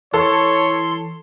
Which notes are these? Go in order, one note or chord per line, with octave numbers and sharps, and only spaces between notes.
E3 A4 C#5 C6